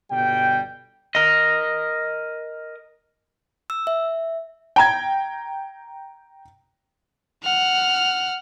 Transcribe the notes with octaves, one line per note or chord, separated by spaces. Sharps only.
G1 B2 G3 G5
A#4 D#5
E6
E5
G5 A#5 G#6
F#5 F6